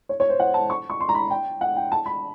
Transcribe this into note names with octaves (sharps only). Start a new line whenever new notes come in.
C#5
C#5
C5
F#5
A5
C#6
C#6
C6
A#5
B5
G5
F#5
G5
A5
B5